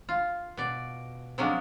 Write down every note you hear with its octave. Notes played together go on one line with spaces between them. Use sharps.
F4
B2 D5
C3 F3 F#3 G#3 C#4 D4